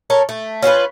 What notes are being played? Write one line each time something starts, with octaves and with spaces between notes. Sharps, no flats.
A4 A#4 C#5
A3
C#4 F4 A4 B4